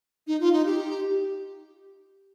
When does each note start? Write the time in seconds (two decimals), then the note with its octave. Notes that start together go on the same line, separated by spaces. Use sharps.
0.27 D#4
0.41 F4
0.53 D#4
0.66 G4